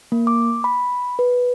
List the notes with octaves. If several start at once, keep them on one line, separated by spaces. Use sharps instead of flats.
A#3
D6
B5
B4